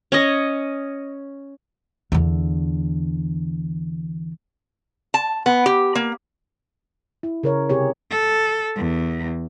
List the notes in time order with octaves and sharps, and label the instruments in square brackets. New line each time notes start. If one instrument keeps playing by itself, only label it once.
[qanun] C#4 C#5 D#5
[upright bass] E2 D3
[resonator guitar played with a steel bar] A5
B3
G4
A#3
[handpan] E4
C#3 A#4 C#5
C3 C#4 G4 G#4 C#5
[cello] A4
E2